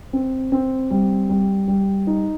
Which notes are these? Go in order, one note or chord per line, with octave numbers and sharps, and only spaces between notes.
C4
C4
G3
G3
G3
D#4